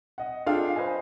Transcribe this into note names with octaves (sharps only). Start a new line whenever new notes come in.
D#5 F#5
D4 F4 G#4 A4 F5 G5
B4 C5 D#5 G#5